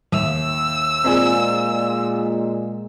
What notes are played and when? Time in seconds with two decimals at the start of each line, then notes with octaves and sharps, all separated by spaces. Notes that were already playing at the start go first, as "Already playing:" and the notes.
0.12 D#2 E5 E6 F7
1.04 A#2 G#3 C4 F4 G#4 C5 D5 G#5